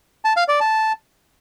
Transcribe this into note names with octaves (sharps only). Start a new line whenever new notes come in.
A5
F5
D5
A5